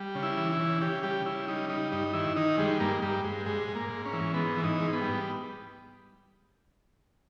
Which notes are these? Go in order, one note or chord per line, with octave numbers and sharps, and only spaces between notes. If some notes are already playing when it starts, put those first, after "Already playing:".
Already playing: G3
C#3
E4
E3
E4
C#3
C#3 G4
G3 G4
C#3 E4
G3 D#4
G3 D#4
G2 D#4
D#3 E4
D#3 D#4
G3 G#3
G2 A#3
G2 G3
G2 G#3
G#2 G#3
G#2
A#3
G#2
C#4
E3
G#2 B3
E3
D#4
G#2
B3
G3